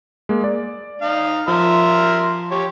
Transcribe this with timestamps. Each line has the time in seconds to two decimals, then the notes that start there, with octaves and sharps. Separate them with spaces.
0.29 G#3 A#3
0.44 D5
1.02 D#4 F5
1.48 F3 A#4 E5 C6
2.51 G4 C#5